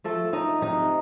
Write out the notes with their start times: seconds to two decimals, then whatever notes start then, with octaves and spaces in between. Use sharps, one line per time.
0.04 F3 A3 A4
0.33 A3 D#4 D#5
0.61 C3 D#4 D#5